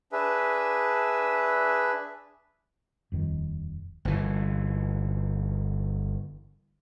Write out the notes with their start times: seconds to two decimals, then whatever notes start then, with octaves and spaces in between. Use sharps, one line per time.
0.12 D4 G#4 B4 E5
3.12 D#1 F2 D#3
4.05 G1 E3